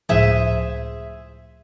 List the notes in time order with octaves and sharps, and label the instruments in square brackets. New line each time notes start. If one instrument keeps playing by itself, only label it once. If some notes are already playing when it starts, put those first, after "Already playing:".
[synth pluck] C#2 A2 F3 [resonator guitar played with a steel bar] G#4 C5 E5